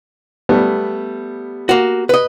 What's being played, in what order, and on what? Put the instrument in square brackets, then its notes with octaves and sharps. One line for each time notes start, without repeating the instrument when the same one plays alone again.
[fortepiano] G3 A3 B3
[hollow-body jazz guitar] A#3 F#4
B4 D#5